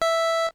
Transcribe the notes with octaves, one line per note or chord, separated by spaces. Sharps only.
E5